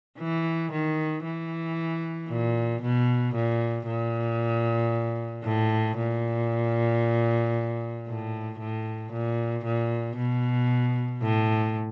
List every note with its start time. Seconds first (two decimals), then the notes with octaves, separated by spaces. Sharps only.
0.18 E3
0.72 D#3
1.24 E3
2.29 A#2
2.82 B2
3.35 A#2
3.86 A#2
5.44 A2
5.97 A#2
8.08 A2
8.60 A2
9.13 A#2
9.65 A#2
10.16 B2
11.22 A2